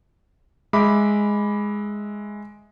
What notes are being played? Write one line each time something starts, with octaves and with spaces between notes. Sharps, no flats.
G#3 E5 B5 D6